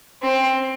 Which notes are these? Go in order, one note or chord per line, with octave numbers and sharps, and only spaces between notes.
C4